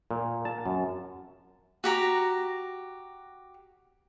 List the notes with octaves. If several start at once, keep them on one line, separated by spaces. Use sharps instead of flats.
A#2
A5
F#2
F#4 G4 A#5